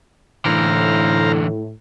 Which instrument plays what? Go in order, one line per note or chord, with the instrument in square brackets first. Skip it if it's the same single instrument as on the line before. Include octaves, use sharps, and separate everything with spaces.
[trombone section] A2 [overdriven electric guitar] D3 E3 [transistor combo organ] C5 F5 A#5